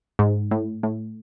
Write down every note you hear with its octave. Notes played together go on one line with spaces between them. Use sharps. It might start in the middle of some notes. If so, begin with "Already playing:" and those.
G#2
A2
A2